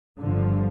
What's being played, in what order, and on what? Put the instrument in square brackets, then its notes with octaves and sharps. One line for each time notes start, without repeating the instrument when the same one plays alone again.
[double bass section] G1 G2 D3 F3